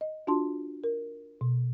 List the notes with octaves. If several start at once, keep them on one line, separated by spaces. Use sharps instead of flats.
D#5
D4 F4 F#4 A5 C6
A#4
B2